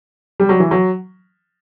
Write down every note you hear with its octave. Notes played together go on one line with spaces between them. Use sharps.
G3
F#3
E3
F#3